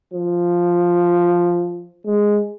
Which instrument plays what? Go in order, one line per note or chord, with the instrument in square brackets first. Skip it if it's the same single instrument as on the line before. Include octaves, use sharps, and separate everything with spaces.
[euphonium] F3
G#3